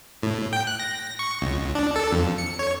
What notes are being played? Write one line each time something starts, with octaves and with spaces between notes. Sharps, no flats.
A2
G5
F#6
A#6
C#6
C#2
D4
A4
F2
C#7
C#5